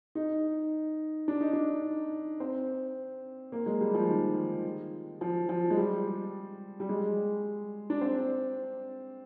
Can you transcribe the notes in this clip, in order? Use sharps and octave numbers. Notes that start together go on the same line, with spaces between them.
D#4
D4
D#4
D4
C4
A#3
G#3
G3
F3
D#3
F3
F3
G#3
G3
G3
G#3
D4
C4